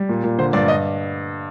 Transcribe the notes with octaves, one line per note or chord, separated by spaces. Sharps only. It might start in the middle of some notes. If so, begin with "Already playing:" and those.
Already playing: G3
A#2
A#2
D3 C5
G2 D5
D#5